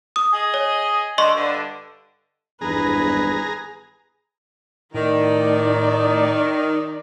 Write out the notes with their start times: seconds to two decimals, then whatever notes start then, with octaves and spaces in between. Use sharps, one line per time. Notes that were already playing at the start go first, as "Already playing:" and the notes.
0.16 D#6
0.33 G#4 D#5
0.54 C#5
1.18 D3 D#5 C6 C#6
1.36 G2 D3
2.61 G#1 E2 G2 G#4 B4 A#5
4.94 A2 D#3 D#4 D5